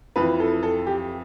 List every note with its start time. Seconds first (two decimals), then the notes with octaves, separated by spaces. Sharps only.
0.16 F2 E3 B4
0.40 A4
0.63 A4
0.87 G4